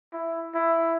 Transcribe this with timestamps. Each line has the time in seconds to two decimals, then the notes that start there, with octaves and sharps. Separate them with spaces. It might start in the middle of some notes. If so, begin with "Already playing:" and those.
0.13 E4
0.55 E4